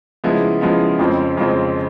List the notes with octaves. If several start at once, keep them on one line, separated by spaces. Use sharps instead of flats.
C#3 F3 G#3 B3 E4
C#3 F3 G#3 B3 E4
F2 C#3 F3 G#3 C4
F2 C#3 F3 G#3 C4